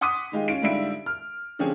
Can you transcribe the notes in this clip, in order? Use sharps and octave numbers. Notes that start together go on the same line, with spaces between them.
F#5 C6 D6 D#6 B6 D#7
D#3 G#3 F4 G4
C#4 F4 D7
G#2 D3 G3 F4 E5 D7
F6
D3 F3 C4 C#4 G4 G#4